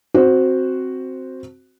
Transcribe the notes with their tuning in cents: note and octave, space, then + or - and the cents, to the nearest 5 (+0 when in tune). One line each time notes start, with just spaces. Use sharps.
C4 +0 F#4 +0 C5 +0